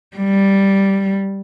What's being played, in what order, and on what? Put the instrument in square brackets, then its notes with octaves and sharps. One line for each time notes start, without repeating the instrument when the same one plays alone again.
[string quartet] G3